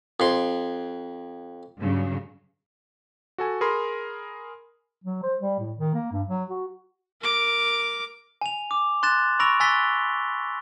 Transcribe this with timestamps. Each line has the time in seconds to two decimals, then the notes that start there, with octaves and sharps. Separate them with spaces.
0.20 F2 C6
1.78 G2 C#3 F#3
3.38 F#4 A4 G#5
3.61 G#4 A#4 B5 C6
5.04 F#3
5.23 C5
5.41 G3
5.59 A2
5.78 D#3
5.94 A#3
6.12 G2
6.27 F#3
6.50 F#4
7.21 A#4 D6
8.41 G#5 F7
8.71 D6
9.03 C6 F#6 A6 E7
9.39 B5 C#6 E6 A#6 D7 F7
9.60 G#5 E6 F#6 A6 B6 G7